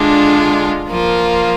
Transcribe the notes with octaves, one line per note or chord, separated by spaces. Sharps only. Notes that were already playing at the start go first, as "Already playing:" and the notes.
Already playing: D3 G#3 D4 F4
F3 A#3 F4